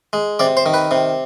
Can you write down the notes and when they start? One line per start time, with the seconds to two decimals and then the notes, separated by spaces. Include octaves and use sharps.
0.13 G#3
0.39 C3 D5
0.57 C5
0.66 D#3
0.74 B4
0.91 C3